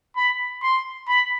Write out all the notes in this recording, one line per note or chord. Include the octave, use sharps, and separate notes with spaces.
B5
C6
B5